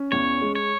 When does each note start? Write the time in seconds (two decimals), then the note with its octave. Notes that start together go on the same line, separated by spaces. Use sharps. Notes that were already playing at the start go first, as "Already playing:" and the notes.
Already playing: C#4
0.12 E2 C#5
0.41 G#3
0.55 C#5